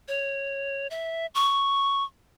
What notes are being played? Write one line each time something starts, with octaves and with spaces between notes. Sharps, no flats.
C#5
E5
C#6